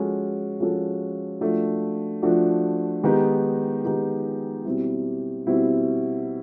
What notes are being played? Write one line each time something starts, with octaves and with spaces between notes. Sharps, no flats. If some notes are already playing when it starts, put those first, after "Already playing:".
Already playing: F3 G#3 C#4 F#4 A4
F3 G#3 C#4 F#4 A4
F3 A3 D4 F#4
F3 A3 D4 F#4
D#3 G#3 B3 D#4 G4
D#3 G#3 B3 D#4 G4
B2 G3 C4 E4
B2 G3 C4 E4